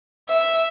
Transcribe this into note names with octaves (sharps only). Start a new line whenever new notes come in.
E5